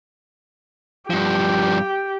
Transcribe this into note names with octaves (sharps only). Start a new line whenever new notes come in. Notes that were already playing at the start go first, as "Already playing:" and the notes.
G2 F3 G4